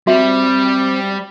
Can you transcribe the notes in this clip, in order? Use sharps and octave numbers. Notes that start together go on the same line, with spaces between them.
G3 C4 F#4 E5